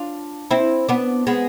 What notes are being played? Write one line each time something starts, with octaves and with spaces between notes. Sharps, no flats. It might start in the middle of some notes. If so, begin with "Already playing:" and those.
Already playing: D4 F4
C4 E4
B3 D4
G#3 B3